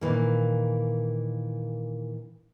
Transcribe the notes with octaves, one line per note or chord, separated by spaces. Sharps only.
A#2 D#3 E3 A#3